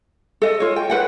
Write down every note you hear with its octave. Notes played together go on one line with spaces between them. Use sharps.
A4 D#5
F4 C#5
G5
B4 F#5 G5